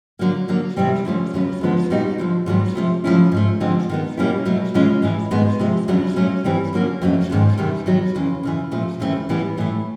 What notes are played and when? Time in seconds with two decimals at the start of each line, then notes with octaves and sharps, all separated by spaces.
0.19 D3 F#3 A#3
0.48 D3 F#3 A#3
0.76 C3 E3 G3 C4
1.05 D3 F3 A3 C#4
1.33 D#2 C#3 F#3 B3
1.61 D#2 D3 F3 G#3 B3
1.90 A#2 G3 B3 D#4 F#4
2.18 D2 D3 F3
2.46 G#2 D#3 F#3 B3
2.75 C3 F3 A3
3.04 C#3 F3 A3 C#4 E4
3.32 G#2 F3 A3
3.60 D3 F3 G#3 C4
3.90 D#3 G#3 B3
4.17 B2 G3 A#3 C#4 E4
4.45 B2 F#3 A3
4.74 C#3 E3 G#3 C#4 F4
5.02 A2 E3 G#3
5.31 G#2 D#3 G#3 B3
5.59 C3 F3 G#3
5.88 E2 C#3 F#3 B3 D4
6.16 A#2 F#3 A3 C#4
6.44 G2 E3 G3 C4
6.73 D3 F#3 A#3 C#4 F#4
7.02 F2 C#3 F#3 A3
7.30 G#2 D#3 G#3 B3
7.58 E2 C3 D#3 G3
7.86 D#3 F#3 B3
8.15 F2 C#3 E3
8.43 F#2 C#3 E3
8.72 A#2 F3 A3
9.00 D#2 C#3 E3 A3 C4
9.29 A2 E3 G3 B3 E4
9.58 A2 E3 A3